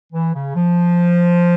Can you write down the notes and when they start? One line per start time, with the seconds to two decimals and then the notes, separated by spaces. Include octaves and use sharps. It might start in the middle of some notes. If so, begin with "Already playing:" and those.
0.13 E3
0.34 C#3
0.55 F3